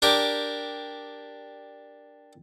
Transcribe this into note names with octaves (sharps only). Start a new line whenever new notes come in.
D4 G4 A#4